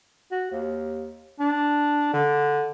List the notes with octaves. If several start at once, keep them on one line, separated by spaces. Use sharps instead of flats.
F#4
D#2
D4
D3